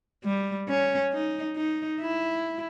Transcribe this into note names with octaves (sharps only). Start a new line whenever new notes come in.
G3
C#4
D#4
D#4
E4